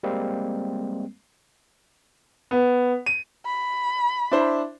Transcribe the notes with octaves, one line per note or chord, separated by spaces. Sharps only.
G3 G#3 A#3 C4
B3
D#7
B5
D4 E4 C5